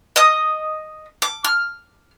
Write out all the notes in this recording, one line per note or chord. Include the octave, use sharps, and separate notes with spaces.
D#5 D#6
D6
F6